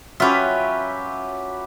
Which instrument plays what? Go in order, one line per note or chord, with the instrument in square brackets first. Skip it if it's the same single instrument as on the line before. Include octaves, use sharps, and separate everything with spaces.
[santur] F#3 [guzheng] C#4 F4 [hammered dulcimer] G4 B4 E5